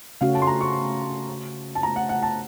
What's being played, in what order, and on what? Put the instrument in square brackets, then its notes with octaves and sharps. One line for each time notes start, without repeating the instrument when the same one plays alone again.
[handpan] C#3 A3 C#4 F#4 [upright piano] F5
[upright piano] A5
C6
A#5
C#6
A5
A#5
F#5
F#5
A5